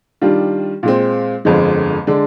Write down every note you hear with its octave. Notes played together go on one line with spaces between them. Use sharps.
D#3 G3 D4 F4
A#2 G#3 C4
G1 F2 D3 G#3
D3 G#3 D4